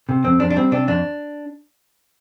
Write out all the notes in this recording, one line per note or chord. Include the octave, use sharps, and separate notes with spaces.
C3
F2 C4
F2 D4
D4
G3 C4
C3 D4
F2 D4